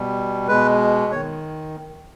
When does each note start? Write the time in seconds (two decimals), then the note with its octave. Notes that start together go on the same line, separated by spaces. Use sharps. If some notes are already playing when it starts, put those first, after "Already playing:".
Already playing: B2 G3
0.48 B2 G#3 B4
1.12 D#3 C#5